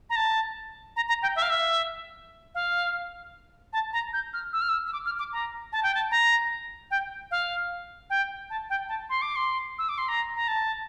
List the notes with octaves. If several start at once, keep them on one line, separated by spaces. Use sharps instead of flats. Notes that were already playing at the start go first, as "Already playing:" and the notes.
A#5
A5
A#5
A#5
G5
E5
F5
E5
F5
A5
A#5
G6
F6
E6
F6
E6
E6
D6
F6
D6
A#5
A5
G5
A5
A#5
G5
F5
G5
A5
G5
A5
C6
D6
C6
E6
D6
C6
A#5
A#5
A5